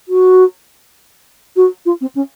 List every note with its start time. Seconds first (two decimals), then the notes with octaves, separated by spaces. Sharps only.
0.08 F#4
1.56 F#4
1.86 F4
2.01 C4
2.15 C#4